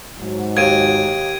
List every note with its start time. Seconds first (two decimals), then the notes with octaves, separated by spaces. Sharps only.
0.21 G#2 F#3
0.57 D#2 G#6 D7 D#7